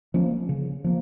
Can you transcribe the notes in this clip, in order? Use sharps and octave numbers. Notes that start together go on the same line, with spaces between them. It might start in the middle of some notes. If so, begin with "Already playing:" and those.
F3 A#3 C#4
C#3
F3 A#3